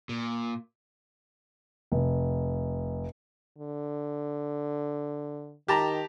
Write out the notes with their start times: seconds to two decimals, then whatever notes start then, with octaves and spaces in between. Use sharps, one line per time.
0.09 A#2
1.92 F1
3.58 D3
5.68 D#3 G4 A5 A#5